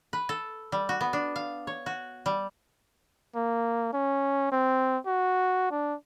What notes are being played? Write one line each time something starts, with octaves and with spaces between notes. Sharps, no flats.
B4
A4
G3
F#4
B3
D4
F5
C#5
F#4
G3
A#3
C#4
C4
F#4
D4